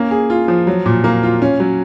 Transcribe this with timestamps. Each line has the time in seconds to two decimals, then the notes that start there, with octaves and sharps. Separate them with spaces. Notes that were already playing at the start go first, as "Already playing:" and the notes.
Already playing: A#3 C#4
0.11 G#4
0.30 F4
0.48 F3
0.67 F#3
0.86 A#2
1.04 A#3
1.23 F4
1.42 C#4
1.60 F#3